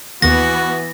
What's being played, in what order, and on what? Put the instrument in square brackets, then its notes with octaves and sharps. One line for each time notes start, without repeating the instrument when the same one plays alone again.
[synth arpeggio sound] D#2 D#3 [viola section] E3 B3 [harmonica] F#4 [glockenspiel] A#6